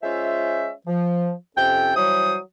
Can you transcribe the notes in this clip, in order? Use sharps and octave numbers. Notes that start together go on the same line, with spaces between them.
G#3 C#4 F4 C5 E5
F3
F2 C3 C#4 A4 G5
E3 F#3 G3 C5 C#5 D#6